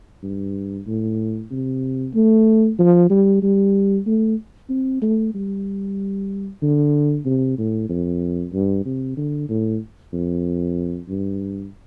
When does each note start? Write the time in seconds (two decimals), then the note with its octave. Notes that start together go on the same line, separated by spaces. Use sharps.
0.23 G2
0.86 A2
1.51 C3
2.14 A3
2.79 F3
3.10 G3
3.42 G3
4.06 A3
4.69 C4
5.02 A3
5.34 G3
6.62 D3
7.25 C3
7.58 A2
7.89 F2
8.53 G2
8.85 C3
9.17 D3
9.49 A2
10.13 F2
11.09 G2